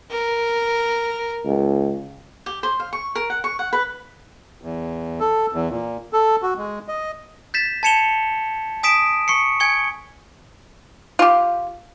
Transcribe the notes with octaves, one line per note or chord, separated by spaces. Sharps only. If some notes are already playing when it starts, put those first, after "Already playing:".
A#4
C#2
G4
C5
F5
C#6
A#4
F#5
C#6
F#5
B4
E2
A4
E2
A#2
A4
F#4
G#3
D#5
G6 A6 B6 E7
A5 G#6 C#7 E7 F7 G7
G#5 D#6 B6 D7 E7
C#6 C7 C#7
G#5 G#6 C#7 G7
F4 G4